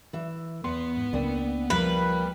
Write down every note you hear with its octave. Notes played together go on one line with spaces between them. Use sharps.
E3 E5
E2 B3 C6
G#2
C#2 A#3 C4 D4
F3 G3 A#4 B4